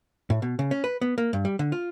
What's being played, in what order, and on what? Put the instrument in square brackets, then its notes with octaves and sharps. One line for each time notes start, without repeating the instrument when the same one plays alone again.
[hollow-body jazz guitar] A2
B2
C#3
C#4
B4
B3
A#3
G2
G3
D3
F4